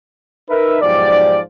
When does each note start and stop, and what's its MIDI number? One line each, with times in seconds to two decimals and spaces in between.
0.50 0.78 63
0.50 0.78 70
0.50 0.78 71
0.50 0.78 76
0.82 1.39 35
0.82 1.39 44
0.82 1.39 53
0.82 1.39 67
0.82 1.39 74